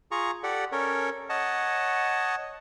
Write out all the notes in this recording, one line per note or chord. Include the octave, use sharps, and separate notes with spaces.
F4 G#4 A#5 C#6
G4 A4 D5 F#5
C#4 A4 A#4 C#5
C#5 D#5 F#5 A5